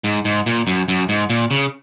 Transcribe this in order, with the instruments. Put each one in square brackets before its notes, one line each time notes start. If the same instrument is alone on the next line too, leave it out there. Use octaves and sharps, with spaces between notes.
[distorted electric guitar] G#2
G#2
A#2
F#2
F#2
G#2
A#2
C#3